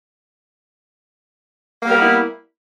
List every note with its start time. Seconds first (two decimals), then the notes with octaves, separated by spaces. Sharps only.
1.82 A#3
1.86 G3
1.91 A#4
1.96 B3
2.00 E4